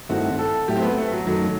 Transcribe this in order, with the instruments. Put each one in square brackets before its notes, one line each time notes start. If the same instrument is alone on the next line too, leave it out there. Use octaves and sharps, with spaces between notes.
[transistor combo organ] G2 D#3 A3 C4 E4 [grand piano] F#4
[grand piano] A4
[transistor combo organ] A2 F#3 A3 E4 [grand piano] G4
[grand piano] C4
B3
A3
F#3
[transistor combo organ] F#2 D#3 A3 [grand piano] F#3